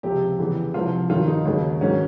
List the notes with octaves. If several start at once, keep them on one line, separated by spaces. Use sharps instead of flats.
C#2 C3 F3 G4
E2 C#3 E3
C2 C3 F3 F4
G2 D#3 F#3 F4
D#4
D#2 C#3 F#3
G#2 D#3 F#3 C#4